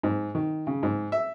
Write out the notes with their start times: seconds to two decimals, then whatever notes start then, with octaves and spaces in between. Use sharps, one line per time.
0.03 G#2
0.35 D#3
0.67 C#3
0.83 G#2
1.12 E5